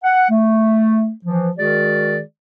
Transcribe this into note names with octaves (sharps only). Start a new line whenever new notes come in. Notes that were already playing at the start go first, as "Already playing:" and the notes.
F#5
A3
E3 F3
D#3 G#3 F#4 G#4 D5